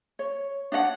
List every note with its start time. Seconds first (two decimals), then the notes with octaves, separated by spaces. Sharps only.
0.19 C#5
0.72 D4 C#5 D#5 F#5